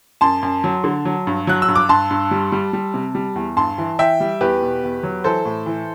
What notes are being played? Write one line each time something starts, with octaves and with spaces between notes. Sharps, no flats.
F#2 A5 C6
F#2
F#3
D3
F#3
G2
F#3 F#6
E6
G2
D6
G2 A5 C6
G2
G3
G3
G3
C3
G3
E2
G2 A5 C6
E3
E3 E5 G5
G3
E2 G4 B4
B2
E2
F#3
E3 A4 C5
A2
E3